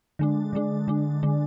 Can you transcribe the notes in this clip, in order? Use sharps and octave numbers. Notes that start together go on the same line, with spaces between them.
D3 G#3 D4
D3 G#3 D4
D3 G#3 D4
D3 G#3 D4